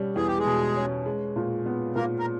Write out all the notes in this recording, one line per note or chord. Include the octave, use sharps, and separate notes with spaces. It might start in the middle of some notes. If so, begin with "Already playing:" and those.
Already playing: B2 G3 C#4
E2 G#4
G4
G#3 G#4
B2
C#4
G#3
A#2
B3
A#2 A#3 A#4
A#4